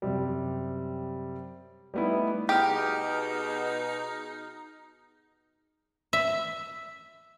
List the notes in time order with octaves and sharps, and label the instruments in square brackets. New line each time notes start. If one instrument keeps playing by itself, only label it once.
[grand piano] F#2 C3 G3
G3 A3 B3 D#4 E4
[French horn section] B2 [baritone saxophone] D#4 [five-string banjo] G4 [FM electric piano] G#4 D#6 F6
[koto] E5